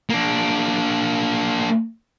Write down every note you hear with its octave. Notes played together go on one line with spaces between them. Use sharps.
A#3 D4